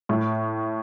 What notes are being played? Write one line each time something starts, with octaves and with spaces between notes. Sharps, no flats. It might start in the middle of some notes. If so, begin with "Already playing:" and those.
A2